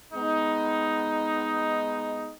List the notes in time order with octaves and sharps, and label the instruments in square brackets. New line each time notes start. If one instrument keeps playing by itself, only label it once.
[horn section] G#3 B3 D#4